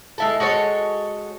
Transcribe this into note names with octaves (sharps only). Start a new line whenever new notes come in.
G#3 E4 A4
G#3 F#4 A4 C#5